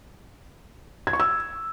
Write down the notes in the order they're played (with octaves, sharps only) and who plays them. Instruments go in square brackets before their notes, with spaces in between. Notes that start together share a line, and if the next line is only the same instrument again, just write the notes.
[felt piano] G#6
C#6
E6